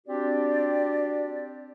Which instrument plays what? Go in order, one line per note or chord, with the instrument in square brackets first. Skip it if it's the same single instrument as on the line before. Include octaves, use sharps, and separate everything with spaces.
[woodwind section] C4 D4 F#4 G4 D5